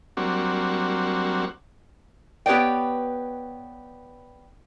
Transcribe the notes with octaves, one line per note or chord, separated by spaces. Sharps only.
F#3 G3 A#3 C4 D4 F#4
B3 G4 B4 C#5 D5 G5